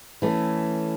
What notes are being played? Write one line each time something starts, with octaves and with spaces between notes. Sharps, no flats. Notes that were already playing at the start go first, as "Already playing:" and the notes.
E3 A3 C#4